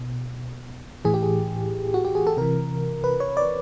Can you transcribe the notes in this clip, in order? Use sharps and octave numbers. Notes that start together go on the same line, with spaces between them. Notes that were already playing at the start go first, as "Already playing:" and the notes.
Already playing: B2
A2 E3 G#4
G4
G#4
F#4
G4
G#4
A4
C3 E3 A#4
B4
C#5
D5